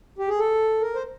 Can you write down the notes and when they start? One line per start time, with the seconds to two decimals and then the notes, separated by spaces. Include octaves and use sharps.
0.18 G4
0.29 G#4
0.39 A4
0.81 A#4
0.95 C5